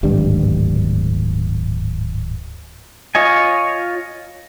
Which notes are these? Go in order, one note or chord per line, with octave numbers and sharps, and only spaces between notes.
D1 G#1 G2 G3
F4 C#5 D#5 G#5